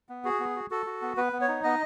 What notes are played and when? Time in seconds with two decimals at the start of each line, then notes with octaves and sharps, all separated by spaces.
0.09 B3
0.25 F#4 G#4
0.40 B3
0.56 F#4
0.70 F#4 A4
0.86 F#4
1.02 B3
1.17 B3 B4
1.33 B3
1.41 C#5
1.48 D#4
1.64 B3 D#5